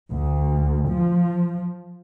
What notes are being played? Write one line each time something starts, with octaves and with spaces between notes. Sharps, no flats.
D2
F3